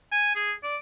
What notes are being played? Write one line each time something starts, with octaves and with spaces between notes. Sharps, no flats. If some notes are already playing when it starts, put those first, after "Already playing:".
G#5
G#4
D5